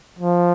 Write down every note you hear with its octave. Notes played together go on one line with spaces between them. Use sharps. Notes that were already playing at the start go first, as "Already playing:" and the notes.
F3